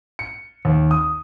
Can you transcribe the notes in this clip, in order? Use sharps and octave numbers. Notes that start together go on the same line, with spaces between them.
C#7
D#2
D#6